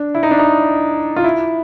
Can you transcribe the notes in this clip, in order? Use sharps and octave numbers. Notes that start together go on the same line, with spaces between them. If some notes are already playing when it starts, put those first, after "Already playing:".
Already playing: D4
E4
D#4
D4
D#4
F4
E4